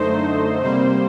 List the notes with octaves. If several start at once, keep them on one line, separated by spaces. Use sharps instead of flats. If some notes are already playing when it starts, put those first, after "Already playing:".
Already playing: F#2 D3 A3 D#4 C5
C3 G3 A#3